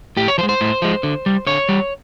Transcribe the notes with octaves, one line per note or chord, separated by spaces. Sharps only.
A2 G4
C#5
F3 C5
G#3
C5
A2
F3 G#3
D3
G3
D3 C#5
G3